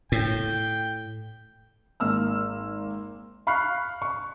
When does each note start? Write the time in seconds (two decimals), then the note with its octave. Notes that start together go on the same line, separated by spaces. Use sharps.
0.12 A2 G5
2.00 G#1 A#3 E6 F6
3.47 F5 B5 C#6 F6 F#6 C7
4.02 C#6